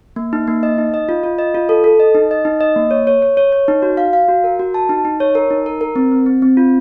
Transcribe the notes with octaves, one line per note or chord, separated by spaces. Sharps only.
A#3
D#4
A#3
D#5
D#4
D#5
F4
F4
D#5
F4
A4
A4
D#5
D#4
D#5
D#4
D#5
A#3
C#5
C#5
C#5
C#5
C#5
D#4
F#4
F5
F5
F#4
A#4
F#4
A5
D#4
D#4
C#5
A#4
D#4
A#4
A#4
C4
C4
C4
C4
F4